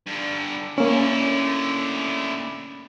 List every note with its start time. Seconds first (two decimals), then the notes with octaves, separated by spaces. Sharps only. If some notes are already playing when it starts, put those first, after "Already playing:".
0.07 G2 D3
0.78 D3 A#3 C#4 E4